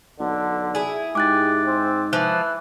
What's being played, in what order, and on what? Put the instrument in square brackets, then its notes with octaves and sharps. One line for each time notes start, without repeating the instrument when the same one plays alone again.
[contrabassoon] B1 [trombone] D3
[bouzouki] E4 G#4
[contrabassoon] G#2 [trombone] G4 [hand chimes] D6 F#6 A6
[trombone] C4
[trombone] E3 [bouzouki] F3 [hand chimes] F#6